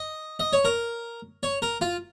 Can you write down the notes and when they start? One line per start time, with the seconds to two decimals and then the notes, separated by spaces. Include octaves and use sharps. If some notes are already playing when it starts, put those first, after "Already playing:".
Already playing: D#5
0.40 D#5
0.53 C#5
0.65 A#4
1.43 C#5
1.62 A#4
1.81 F4